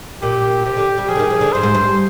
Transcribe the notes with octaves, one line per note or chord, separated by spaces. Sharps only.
A#2 G4
C3 G4
D3
G3
F3 G#4
D3
D#3
F3
D3
G2 C5
G#2
G2